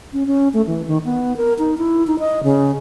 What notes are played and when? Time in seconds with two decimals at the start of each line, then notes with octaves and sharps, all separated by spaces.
0.13 C#4
0.27 C#4
0.53 A3
0.67 E3
0.88 D#3
1.05 B3
1.37 A#4
1.59 D#4
1.78 E4
2.07 D#4
2.19 D#5
2.44 C#3